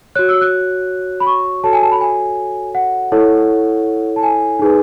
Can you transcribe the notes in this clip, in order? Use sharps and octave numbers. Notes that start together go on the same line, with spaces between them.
F#4 C#5 F#6
E6
F#6
B5
C#6
F#4 A4 C#5 A5
G#5
A5
B5
G#5
F#5
E4 A4 C#5
A5
G#5
D#4 G#4 B4